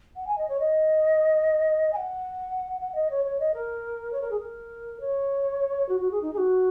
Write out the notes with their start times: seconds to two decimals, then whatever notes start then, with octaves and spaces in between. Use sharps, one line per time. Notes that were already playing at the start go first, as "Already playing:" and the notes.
0.16 F#5
0.27 G#5
0.38 D#5
0.49 C#5
0.60 D#5
1.93 G#5
1.96 F#5
2.80 F#5
2.95 D#5
3.10 C#5
3.25 C#5
3.40 D#5
3.54 A#4
4.13 C#5
4.21 A#4
4.31 G#4
4.39 A#4
5.00 C#5
5.89 F#4
6.00 F#4
6.11 G#4
6.22 D#4
6.33 G#4
6.38 F#4